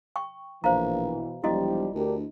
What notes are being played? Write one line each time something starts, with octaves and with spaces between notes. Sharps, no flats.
G5 C#6
A#1 B2 E3 C5 F5 A#5
E1 F3 G3 E4 F#4 G4 D#5
D2 D4 G4 A#4